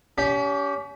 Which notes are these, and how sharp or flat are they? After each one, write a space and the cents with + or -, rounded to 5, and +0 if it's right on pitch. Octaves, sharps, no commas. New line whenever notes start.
C#4 +35 G4 +0